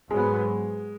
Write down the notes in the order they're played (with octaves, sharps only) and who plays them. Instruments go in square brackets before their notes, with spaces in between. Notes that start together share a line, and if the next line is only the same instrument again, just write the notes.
[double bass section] G#2 F#3 B3 [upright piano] G#3